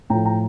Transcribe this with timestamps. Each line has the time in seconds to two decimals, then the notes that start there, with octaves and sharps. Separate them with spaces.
0.10 A2 F3 G5 A#5
0.25 G5 A#5